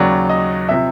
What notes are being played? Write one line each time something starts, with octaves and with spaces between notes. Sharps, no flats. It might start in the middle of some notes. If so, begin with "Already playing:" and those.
Already playing: D#2 C#3 F#3 D5
D#5
C3 F3 E5